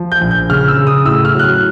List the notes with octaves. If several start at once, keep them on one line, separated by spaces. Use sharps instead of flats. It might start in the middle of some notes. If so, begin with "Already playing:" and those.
Already playing: F3
G6
A#1
G6
C#3 F6
E6
C#3
D#6
A2 E6
F6
F#3 F#6
F6